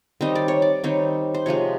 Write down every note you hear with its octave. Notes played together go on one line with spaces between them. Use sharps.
D#3 G3 C4 D#4 D#5
D5
C#5
D5
D#3 G3 C4 D#4 C#5
C5
C3 F3 G#3 C#5